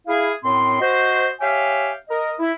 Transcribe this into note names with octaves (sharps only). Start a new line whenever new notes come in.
E4 G#4 F5
F#2 A2 C4 C6
F#4 C5 D#5
G4 C#5 E5 F5 G5 G#5
A#4 D#5
E4